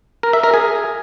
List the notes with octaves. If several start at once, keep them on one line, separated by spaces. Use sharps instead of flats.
A#4
E5
A#4
G#4